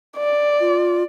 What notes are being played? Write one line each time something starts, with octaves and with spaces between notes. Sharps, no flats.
D5
F4